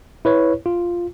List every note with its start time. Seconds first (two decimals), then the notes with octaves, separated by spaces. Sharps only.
0.25 E4 B4 C#5
0.66 F4